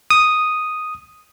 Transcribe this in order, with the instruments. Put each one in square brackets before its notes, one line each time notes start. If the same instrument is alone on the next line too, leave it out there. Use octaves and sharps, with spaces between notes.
[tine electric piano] D#6